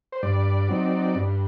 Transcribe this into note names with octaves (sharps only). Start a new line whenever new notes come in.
C5
G2 D5
F#3 C4 D#4
G2